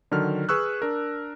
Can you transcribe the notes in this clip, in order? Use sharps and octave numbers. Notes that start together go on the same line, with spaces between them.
D3 D#3 F#3 F6
G#4 B4 C#6 E6 F#6
D4 A#4